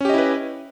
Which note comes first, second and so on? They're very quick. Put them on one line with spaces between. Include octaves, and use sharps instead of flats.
C#4 G4 D#5 E4 B4